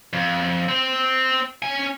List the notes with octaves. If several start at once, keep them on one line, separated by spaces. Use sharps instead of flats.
F2
C4
C#4 G#5